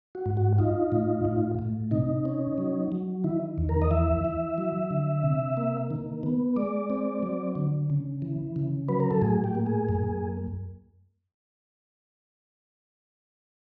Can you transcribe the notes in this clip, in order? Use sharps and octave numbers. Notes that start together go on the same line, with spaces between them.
F#4
G#2
F#4
D#4 F4
A2
A2
A2
C3 D#4
C#4
F#3
F#3
D#3 E4
E2
A#4
D#5
E3 E5
E3
F#3
D3
C3
A#3
D#3
B3
G#3 D5
C4
F#3
D3
C#3
E3
C#3
F#3 B4
A#4
A4
A2 G#4
G4
A#3
G#4
F#2